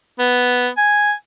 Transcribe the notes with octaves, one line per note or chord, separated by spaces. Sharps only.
B3
G#5